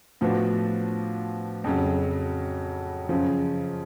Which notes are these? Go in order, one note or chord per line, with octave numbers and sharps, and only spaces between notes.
A2 F3 B3 D4 F#4
F2 C#3 F#3
F#2 C#3 F3